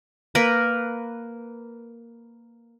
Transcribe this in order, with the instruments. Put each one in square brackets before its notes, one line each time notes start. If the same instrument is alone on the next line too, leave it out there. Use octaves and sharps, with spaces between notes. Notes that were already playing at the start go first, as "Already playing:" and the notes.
[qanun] A#3 A#4 B4